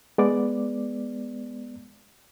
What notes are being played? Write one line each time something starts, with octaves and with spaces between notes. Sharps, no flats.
G#3 B3 D5 D6